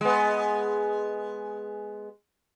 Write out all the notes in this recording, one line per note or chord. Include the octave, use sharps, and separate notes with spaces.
G#3 B3